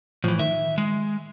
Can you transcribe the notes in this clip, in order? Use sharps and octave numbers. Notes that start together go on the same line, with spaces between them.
A2 E3 F3
D#3 E5
G#3